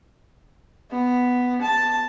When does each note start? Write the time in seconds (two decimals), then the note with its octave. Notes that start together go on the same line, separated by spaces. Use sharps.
0.92 B3
1.61 A5